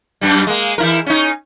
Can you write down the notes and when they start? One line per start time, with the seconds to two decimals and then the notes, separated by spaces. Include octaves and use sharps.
0.21 F#2 G3
0.47 G#3 A#3
0.78 E3 E4 A#4
1.06 C#4 D#4